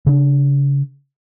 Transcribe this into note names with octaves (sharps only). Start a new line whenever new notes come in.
C#3 D4